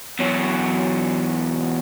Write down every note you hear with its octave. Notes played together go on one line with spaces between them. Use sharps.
E2 F#3